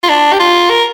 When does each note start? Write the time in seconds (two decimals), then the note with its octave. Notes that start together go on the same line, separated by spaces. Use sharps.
0.03 F4
0.09 D4
0.33 G4
0.40 F4
0.70 A#4